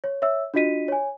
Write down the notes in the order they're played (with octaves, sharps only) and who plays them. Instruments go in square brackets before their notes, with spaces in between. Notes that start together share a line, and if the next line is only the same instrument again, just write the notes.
[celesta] C#5
C#5 E5 E6
D4 F4 F#4 D#5 B6 D#7
C#5 G#5